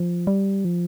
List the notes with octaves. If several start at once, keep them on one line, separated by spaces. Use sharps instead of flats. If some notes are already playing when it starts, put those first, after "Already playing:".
Already playing: F3
G3
F3